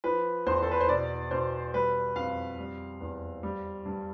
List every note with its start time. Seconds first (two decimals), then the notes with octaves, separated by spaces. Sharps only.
0.04 F3 B4
0.46 E2 C5
0.62 A4
0.71 B4
0.81 C5
0.88 B2 D5
1.31 B2 C5
1.74 G3 B4
2.16 F2 F5
2.59 G3
3.00 E2
3.43 G3
3.86 G2